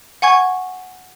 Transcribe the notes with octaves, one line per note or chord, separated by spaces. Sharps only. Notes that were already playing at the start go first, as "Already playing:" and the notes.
F#5 G#5 C#6 G#6